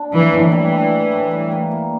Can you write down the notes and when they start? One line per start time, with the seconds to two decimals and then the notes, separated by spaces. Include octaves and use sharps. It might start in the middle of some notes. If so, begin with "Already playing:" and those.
Already playing: D4
0.12 E3 A#3
0.32 A2
0.42 E3
0.52 G3
0.72 D4
0.92 G3
1.12 A2
1.31 G3
1.52 A#3
1.71 A#3